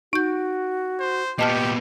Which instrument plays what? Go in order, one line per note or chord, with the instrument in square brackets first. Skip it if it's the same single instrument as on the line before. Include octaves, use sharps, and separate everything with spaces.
[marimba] D#4 G6 [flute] F#4
[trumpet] C5
[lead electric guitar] A#2 B3 [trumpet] G4 [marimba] D#5 A5 F6